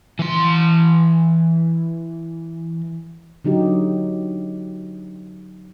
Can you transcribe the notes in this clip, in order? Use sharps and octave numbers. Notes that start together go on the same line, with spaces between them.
E3 C6
D3 F#3 D#4 G4